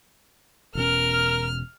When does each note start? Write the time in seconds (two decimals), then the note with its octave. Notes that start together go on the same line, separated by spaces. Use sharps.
0.75 E1 B2 C#4 A#4 F6